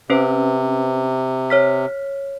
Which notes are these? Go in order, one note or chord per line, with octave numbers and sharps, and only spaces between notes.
C3 C#4 B4 C5
C#5 F6 B6